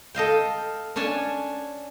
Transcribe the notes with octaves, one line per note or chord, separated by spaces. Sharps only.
A4 D#5 F5 G5
C#4 D4 C#5 G#5 A5